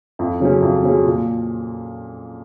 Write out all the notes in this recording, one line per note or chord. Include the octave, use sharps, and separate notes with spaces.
F2
C#3 F#3 C#4
F2
C#3 F#3 C#4
A#2